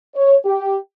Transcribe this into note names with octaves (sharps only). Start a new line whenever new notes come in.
C#5
G4